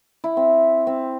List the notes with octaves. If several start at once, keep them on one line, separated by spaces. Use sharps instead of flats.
E4
C4
C4